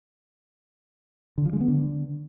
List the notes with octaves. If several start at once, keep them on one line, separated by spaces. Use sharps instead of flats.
D3
F3
G#3
B3
D3